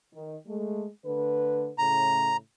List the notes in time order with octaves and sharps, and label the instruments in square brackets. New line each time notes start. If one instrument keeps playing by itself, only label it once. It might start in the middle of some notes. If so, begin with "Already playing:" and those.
[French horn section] D#3
G#3 A3
D3 A3 B4
[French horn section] A2 C#3 [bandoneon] A#5